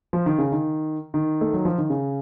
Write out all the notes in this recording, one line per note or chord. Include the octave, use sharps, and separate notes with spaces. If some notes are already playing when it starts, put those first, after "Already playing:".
F3
D#3
C#3
D#3
D#3
A3
F#3
F3
D#3
C#3